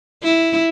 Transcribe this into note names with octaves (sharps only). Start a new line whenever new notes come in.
E4